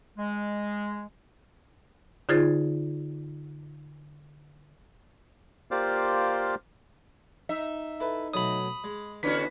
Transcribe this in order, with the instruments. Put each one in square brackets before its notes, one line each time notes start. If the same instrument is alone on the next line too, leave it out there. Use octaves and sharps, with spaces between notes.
[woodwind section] G#3
[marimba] D3 D#4 F4 G#4 C5 A6
[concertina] A#3 F4 G4 C5 D5 F5
[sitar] D#4 E5
[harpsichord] E4 A4 B4
[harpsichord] B2 F#3 A3 [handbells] B5 D#6
[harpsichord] G#3
[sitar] D3 C#4 F#4 [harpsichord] E3 B3 [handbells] B6